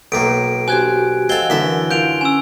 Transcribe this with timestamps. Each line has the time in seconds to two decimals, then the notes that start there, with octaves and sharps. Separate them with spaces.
0.12 B1 A2 A#3 D7
0.68 D4 F#4 G4 C5 G#5 F#6 G#6
1.29 C4 A4 D#5 F5 F#5 G#6 G7
1.50 F#2 D3 E3 A#4 E5
1.91 F4 F5 G6 D7 F7
2.21 C#4 G#5 E6